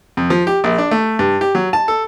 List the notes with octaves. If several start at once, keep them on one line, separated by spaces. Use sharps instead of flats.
F2
F3
G4
A#1
D4
A3
G2
G4
F#3
A5
A4